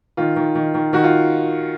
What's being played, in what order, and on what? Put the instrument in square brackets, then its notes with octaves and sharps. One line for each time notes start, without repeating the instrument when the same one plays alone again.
[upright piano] D#3 F4
D#3
D#3
D#3
D#3 F#4
F4